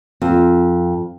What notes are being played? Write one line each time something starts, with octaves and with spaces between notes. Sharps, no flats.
F2